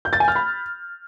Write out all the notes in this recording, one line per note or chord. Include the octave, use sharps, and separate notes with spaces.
G6
A6
G#5
F6
B5